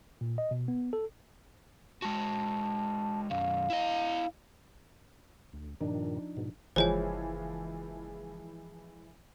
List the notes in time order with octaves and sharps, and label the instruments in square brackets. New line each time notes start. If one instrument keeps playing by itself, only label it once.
[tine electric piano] A#2
D#5
B2
B3
A4
[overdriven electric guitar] G#3 F#4 [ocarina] A5
[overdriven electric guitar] B1 F#2 [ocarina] F5
[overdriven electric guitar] E4 D#5
[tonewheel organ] D2
[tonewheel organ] G2 A#2 D#3 [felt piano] F3 D4 D#4
[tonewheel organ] G#2 B2
[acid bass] F#1 [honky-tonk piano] E3 F3 G#3 [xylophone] C5 C#5 G#5